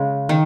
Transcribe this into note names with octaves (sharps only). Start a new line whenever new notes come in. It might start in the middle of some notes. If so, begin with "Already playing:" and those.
Already playing: C#3 G#3
D#3